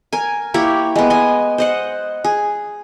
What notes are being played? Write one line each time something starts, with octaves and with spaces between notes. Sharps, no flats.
A#4 G#5
A#3 E4 G4 C#5
G#3 B3
D#5 G#5
C5 D#5 F#5
G#4